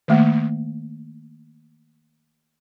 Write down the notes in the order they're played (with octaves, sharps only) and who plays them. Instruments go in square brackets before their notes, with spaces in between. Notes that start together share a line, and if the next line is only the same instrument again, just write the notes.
[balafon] D#3 A3 A#3